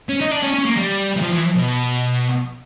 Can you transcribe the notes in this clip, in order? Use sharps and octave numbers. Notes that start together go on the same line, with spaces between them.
C#4
D#4
D4
C#4
C#4
A#3
G3
E3
F3
E3
B2